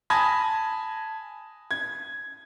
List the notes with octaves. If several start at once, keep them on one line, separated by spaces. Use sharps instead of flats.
G#5 A5 B5 D#6 G#6 A#6
G#6